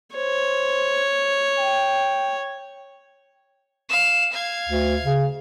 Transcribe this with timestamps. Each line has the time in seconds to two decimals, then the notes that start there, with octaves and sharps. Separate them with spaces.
0.16 C5 C#5
1.58 G5
3.89 F5 E7
4.32 F5 G#6
4.69 D2
5.05 C#3